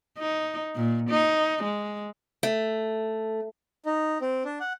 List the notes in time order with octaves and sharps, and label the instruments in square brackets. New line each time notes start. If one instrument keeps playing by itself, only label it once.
[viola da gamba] D#4
A#2
D#4
G#3
[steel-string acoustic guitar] A3
[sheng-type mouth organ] D#4
C4
D4
F#5